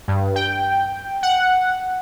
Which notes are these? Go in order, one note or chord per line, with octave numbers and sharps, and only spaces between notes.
G2
G5
F#5